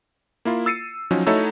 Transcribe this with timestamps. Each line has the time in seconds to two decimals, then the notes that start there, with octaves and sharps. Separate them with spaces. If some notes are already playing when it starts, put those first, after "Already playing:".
0.45 A#3 E4 F4
0.66 E6 A6 C7 C#7 D#7
1.11 F3 F#3 C#4 D#4
1.27 A3 D#4 E4 F#4 A4 C#5